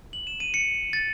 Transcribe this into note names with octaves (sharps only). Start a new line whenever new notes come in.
F#7
E7
D#7
C#7
A6